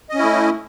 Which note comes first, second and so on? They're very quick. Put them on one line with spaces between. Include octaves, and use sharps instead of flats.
D#5 C#4 E4 A3